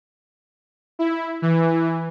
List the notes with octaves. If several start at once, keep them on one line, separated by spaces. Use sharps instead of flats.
E4
E3